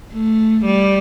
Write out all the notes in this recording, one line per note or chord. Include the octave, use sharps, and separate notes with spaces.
A3
G3